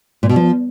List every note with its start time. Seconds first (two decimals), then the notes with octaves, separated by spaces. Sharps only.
0.23 A#2
0.29 B2
0.36 F3